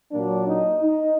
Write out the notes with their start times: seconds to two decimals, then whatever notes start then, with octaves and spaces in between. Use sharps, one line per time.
0.12 A#2 F#3 A#3 D4
0.47 D#4
0.79 D#4